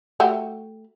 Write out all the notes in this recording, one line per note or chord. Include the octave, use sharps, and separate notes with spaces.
A3 F#4 G4